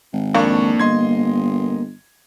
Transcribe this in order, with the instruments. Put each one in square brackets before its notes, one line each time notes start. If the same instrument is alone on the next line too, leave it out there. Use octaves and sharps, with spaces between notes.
[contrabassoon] G#1
[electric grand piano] F2 D4 C#6 [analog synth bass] A#3
[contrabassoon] G1 [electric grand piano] D#5 C6 G#6